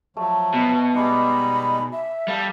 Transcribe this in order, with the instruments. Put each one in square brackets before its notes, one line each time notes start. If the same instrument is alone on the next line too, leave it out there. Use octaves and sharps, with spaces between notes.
[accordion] F3 F#3 [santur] A3
[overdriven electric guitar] B2
[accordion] G3 G#3 D#4 [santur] G#5 C6 D6 [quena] B5
[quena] E5
[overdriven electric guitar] G3 [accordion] A4 [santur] F5